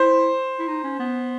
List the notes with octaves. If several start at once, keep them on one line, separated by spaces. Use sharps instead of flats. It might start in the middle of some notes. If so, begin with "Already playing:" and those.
Already playing: E4 C5
E4
D#4
C#4
B3